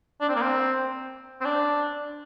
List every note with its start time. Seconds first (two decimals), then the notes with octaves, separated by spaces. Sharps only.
0.21 D4
0.29 C4
0.35 A#3
0.42 C4
1.41 C4
1.45 D4